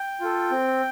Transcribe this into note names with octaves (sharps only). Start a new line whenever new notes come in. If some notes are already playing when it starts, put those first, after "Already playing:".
Already playing: G5
F4 A4
C4